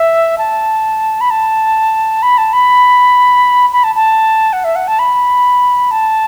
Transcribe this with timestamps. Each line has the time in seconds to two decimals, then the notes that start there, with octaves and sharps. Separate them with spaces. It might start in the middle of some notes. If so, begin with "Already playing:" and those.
Already playing: E5
0.38 A5
1.21 B5
1.30 A5
2.23 B5
2.38 A5
2.53 B5
3.72 B5
3.84 A5
3.95 A5
4.53 F#5
4.64 E5
4.76 F#5
4.88 A5
4.99 B5
5.91 A5